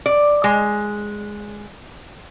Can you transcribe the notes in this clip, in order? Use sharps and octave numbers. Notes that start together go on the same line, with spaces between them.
D5
G#3